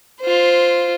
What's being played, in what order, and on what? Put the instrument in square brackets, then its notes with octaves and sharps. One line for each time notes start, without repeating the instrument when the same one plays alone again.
[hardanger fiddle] F4 C5